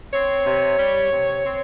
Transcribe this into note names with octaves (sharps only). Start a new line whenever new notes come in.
C4 C#5
C3
G3
C3
C4